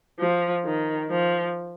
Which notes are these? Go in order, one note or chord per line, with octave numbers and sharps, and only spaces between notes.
F3
D#3
F3